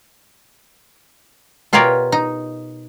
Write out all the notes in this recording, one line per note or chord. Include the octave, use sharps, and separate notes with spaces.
B2 F4 G4 A#4 C#5 D5
D#4